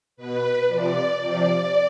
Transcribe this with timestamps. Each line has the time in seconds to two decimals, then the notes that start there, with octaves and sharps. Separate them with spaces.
0.17 B2 B4
0.68 C3 F3 D5
1.21 C3 F3 D5